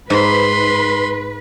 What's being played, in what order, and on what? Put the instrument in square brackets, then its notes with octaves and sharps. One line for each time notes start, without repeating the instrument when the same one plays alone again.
[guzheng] G#2 [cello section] B4 [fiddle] B5 C6